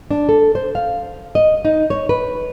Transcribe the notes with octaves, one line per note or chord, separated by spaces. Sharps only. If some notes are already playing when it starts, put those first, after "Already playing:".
D4
A4
C5
F5
D#5
D#4
C#5
B4